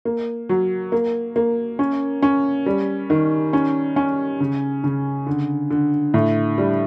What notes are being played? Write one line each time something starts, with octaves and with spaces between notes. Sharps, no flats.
A#3
F#3
A#3
A#3
C#4
C#4
G3
D#3
C#4
C#4
C#3
C#3
D3
D3
A2
G3